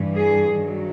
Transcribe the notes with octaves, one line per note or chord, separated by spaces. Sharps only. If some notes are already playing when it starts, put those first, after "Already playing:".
Already playing: G2 E3
G#4
G2 D#3 F#3